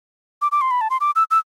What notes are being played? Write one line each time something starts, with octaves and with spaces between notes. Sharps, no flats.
D6
D6
C6
B5
A5
C6
D6
E6
E6